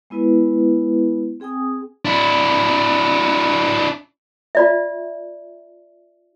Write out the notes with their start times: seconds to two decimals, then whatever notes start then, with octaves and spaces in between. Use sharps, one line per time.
0.10 G#3 B3 E4 B4
1.40 C4 G#4 G5 G#5 D#6
2.05 D4 E4
4.55 F4 D5 E5